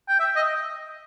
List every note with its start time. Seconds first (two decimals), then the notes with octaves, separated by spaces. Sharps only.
0.08 G5
0.20 E5
0.36 D#5